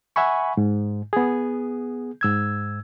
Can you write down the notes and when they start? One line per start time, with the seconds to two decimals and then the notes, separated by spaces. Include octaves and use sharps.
0.16 E5 F#5 G#5 B5 C#6
0.57 G#2
1.13 B3 G#4
2.21 G#2 E6 G#6